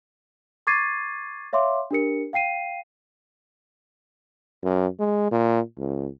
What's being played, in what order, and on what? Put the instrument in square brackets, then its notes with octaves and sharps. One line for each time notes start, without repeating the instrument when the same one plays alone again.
[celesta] C#6 D6 G#6 A6 C7 D#7
C#5 E5 F5 C6 D6
D4 G4 A#4 C#7
F5 G5 C7 D#7
[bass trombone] F#2
G#3
A#2
C#2